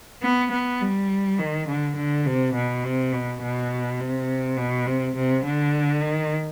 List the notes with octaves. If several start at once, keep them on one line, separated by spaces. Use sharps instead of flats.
B3
B3
G3
D#3
D3
D3
C3
B2
C3
B2
B2
C3
B2
C3
C3
D3
D#3